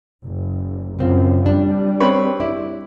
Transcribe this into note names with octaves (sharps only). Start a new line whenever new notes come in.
F#1
F#2 C#3 C4 F4
G3 D4
C4 B4 C#5
E4 D5